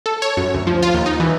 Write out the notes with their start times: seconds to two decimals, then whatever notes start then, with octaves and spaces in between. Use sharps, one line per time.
0.06 A4
0.22 C#5
0.37 F#2
0.54 D2
0.67 F3
0.82 F4
0.94 D#2
1.06 D#4
1.20 E3